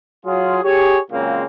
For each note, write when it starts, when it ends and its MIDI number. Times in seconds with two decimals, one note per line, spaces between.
0.25 0.58 54
0.25 0.58 65
0.25 0.58 68
0.63 0.98 67
0.63 0.98 68
0.63 0.98 73
1.11 1.44 46
1.11 1.44 49
1.11 1.44 54
1.11 1.44 56
1.11 1.44 58
1.11 1.44 60